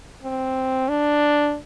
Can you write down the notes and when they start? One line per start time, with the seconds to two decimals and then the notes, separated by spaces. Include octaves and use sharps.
0.23 C4
0.89 D4